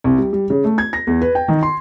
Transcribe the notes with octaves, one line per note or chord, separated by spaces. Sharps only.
C2
G3
G3
C#3
A3
G#6
A#6
E2
B4
G5
D#3
C6